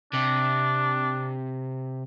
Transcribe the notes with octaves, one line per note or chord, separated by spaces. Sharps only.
C3 D4